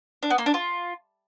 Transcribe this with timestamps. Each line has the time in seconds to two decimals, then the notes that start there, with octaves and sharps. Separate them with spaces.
0.23 D4
0.30 B3
0.38 A#3
0.46 D4
0.54 F4